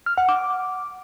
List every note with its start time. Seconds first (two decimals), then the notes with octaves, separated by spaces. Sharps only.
0.06 F6
0.18 F#5
0.29 D6